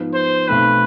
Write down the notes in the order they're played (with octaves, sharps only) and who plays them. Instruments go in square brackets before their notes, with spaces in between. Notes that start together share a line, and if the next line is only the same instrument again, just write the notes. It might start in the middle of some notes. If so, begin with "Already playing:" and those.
Already playing: [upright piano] G#2 F3 B3
[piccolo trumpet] C5
[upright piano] B1 B2 A3 C4 [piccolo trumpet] B4